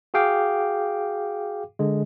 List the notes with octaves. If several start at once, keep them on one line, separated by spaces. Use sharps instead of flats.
F#4 G#4 F5 G5 D6
D3 G#3